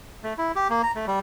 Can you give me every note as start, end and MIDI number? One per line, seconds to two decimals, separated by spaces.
0.23 0.33 57
0.38 0.52 64
0.56 0.68 67
0.70 0.82 58
0.83 0.92 82
0.95 1.05 57
1.07 1.19 55